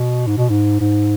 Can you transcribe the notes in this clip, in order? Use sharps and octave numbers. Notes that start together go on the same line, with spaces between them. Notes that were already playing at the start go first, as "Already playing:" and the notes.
Already playing: B2
G#2
B2
G#2
G#2